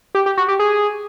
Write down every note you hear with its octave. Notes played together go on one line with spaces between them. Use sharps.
G4
G4
F#4
G4
G#4